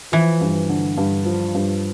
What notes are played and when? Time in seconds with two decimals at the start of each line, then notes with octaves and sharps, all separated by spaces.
0.12 E3 F3
0.41 G2
0.69 D3
0.97 G2
1.26 F3
1.55 G2